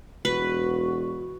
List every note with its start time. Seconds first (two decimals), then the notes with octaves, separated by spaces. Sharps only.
0.25 E1 F#4 B4